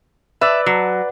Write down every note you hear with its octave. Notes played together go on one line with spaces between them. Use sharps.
B4 D5 E5
F#3